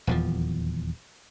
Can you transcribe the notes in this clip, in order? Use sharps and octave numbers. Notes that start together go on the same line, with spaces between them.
D#1 E2 F3